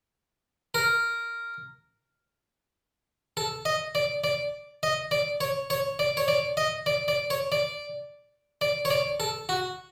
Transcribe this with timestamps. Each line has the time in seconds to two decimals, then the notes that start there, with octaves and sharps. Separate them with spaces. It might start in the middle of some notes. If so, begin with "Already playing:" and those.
0.74 A#4
3.37 A4
3.65 D#5
3.95 D5
4.24 D5
4.83 D#5
5.11 D5
5.41 C#5
5.70 C#5
5.99 D5
6.17 C#5
6.28 D5
6.57 D#5
6.86 D5
7.08 D5
7.30 C#5
7.52 D5
8.61 D5
8.85 C#5
8.90 D5
9.20 A4
9.49 F#4